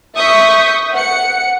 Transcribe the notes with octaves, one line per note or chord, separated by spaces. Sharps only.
E5 C#6 D#6 G6 B6
F#5 C#7